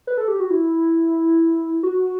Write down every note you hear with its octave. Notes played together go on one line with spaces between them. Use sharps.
B4
A4
G4
F#4
E4
F#4